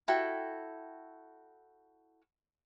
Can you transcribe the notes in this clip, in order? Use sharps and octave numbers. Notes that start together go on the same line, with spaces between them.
E4 F#4 A4 G5